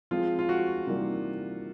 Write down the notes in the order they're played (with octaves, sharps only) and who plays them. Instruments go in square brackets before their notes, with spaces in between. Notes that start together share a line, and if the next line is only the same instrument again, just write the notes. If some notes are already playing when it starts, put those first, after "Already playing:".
[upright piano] F3 G#3 C4 [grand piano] F4
[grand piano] F4
F#4
[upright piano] C3 E3 G3 A#3 D#4